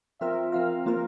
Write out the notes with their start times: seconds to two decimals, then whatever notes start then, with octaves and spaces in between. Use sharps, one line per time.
0.21 F3 C4 F4 A#4 E5
0.52 F3 C4 F4 A#4 F5
0.85 F3 A#3 F4 A#4